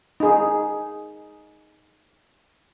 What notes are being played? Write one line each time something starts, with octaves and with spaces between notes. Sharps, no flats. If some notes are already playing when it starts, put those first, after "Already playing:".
D#4 G#4